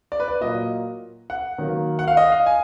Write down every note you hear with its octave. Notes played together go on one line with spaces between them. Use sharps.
D5
B4
D5
A#2 F#3 A#3 D#5
F#5
D#3 F#3 A#3
F#5
F5
D#5
F5
G#5